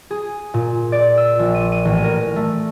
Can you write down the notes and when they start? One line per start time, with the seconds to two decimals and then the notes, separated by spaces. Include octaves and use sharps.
0.11 G#4
0.54 A#2
0.92 D5
1.17 E6
1.39 A#1
1.55 D#7
1.72 D#7
1.85 A1
2.04 A#4
2.36 A3